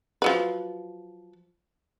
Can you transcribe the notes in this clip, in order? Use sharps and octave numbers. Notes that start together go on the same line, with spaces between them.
F3 F#3 B4